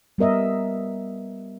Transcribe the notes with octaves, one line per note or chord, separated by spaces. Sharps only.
G3 B3 A#4 D#5 E5